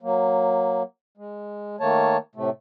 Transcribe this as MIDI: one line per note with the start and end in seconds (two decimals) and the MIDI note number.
0.02 0.83 54
0.02 0.83 58
1.17 1.76 56
1.80 2.17 51
1.80 2.17 57
1.80 2.17 58
1.80 2.17 73
1.80 2.17 81
2.35 2.50 45
2.35 2.50 48
2.35 2.50 57